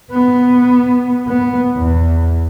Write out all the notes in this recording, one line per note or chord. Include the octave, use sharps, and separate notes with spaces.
B3
B3
E2